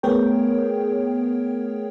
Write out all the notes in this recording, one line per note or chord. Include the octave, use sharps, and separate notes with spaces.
A3 B3 G#4 A#4 C#5 G5